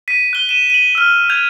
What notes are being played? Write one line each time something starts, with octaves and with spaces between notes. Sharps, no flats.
B6 D#7
F#6 G7
D#7 E7
D#7 F#7
E6 F6
G6 G#6 F7